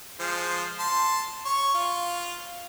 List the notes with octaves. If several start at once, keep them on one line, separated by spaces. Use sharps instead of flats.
F3 G#3 C5
A5 C6
C#5 C#6
F4